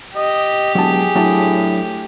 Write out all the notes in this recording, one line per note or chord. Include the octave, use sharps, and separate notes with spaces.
G4 D#5
E1 F#3 G#4 A5
A2 F#3 A3 D4